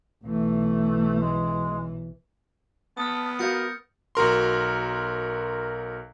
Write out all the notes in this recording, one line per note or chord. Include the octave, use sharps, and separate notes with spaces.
B1 E3 A3
G#3
B3 A5 D#6 F6
F#4 A#4 F5 G6 A6 C#7
B1 F#4 A#4 C6